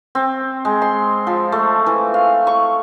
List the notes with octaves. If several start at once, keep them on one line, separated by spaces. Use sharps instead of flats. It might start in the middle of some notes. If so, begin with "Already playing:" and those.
C4
G#3
C6
F3
A3
E3
F5
C#6